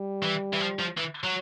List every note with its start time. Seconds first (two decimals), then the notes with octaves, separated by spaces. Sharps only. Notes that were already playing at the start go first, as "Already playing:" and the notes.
Already playing: G3
0.23 E3
0.53 E3
0.60 F3
0.79 F3
0.97 E3
1.24 F#3